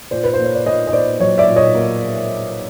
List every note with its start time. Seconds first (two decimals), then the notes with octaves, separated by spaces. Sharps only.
0.11 A#2 C5 D5
0.23 B4
0.34 C5
0.39 A#3
0.44 C#5
0.55 D5
0.65 A#2 C#5 D#5
0.87 D#5
0.93 A#2 C5 D5
1.20 F#3 C#5 D#5
1.38 D5 E5
1.48 A#2
1.56 C#5 D#5
1.74 A#3